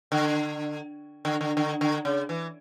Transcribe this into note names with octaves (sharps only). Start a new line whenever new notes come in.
D3
D3
D3
D3
D3
C#3
E3